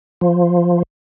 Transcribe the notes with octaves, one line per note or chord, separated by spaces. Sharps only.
F3